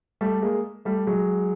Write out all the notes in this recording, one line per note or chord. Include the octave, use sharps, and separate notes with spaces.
G3 A3
G#3 A#3
G3 A3
F#3 G#3